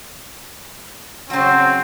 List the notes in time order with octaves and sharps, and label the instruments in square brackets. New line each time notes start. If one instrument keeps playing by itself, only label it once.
[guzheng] C#3 F#3 [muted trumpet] C4